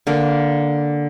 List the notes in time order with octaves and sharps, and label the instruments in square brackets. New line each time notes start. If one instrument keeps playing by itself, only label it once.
[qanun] D3 A#3